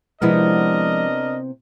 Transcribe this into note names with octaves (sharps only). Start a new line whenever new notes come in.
C3 F3 G#3 B3 D4 E4 A#4 D#5